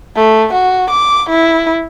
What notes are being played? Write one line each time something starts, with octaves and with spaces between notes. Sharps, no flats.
A3
F#4
D6
E4